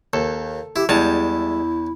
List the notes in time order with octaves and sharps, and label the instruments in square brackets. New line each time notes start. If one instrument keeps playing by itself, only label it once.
[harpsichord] D#2 [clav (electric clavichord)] A4
[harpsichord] E4 [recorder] G4
[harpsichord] E2 A5 [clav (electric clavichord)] G3 G#3 [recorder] E4